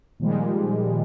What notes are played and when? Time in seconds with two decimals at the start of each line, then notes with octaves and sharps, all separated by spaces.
0.20 A#2 D#3 F3 G3 G#3